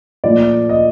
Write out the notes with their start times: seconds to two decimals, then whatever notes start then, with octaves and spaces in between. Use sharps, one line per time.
0.24 A#2 F3 A3 D5
0.69 D#5